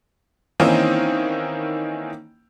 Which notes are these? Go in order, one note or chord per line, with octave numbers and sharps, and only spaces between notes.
D#3 E3 A#3 C4 C#4 D#4